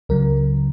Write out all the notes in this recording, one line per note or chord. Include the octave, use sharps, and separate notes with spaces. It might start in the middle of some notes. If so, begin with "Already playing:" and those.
C#2 C#3 F#3 A#4